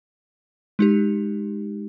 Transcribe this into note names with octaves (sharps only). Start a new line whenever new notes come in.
G#3 D#4 G4